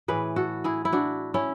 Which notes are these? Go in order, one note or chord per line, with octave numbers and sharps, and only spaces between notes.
A2 E3 G#4 B4
F#4 A4
E4 G#4
E4
D4 F#4
C#4 E4